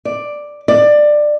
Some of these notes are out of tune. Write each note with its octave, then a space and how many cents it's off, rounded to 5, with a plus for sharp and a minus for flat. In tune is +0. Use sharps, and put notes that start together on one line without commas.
D5 +5
D5 +15